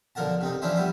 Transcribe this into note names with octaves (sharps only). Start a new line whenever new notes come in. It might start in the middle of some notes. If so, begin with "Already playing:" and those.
B1 D3 F3 A#4 F#5 A5
C3 C4 D#4
E3 F3 C#4 D4 E4 C5
G3 B3 E4